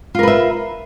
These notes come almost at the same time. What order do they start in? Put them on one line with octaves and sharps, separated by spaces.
F4 A#4 B4 E5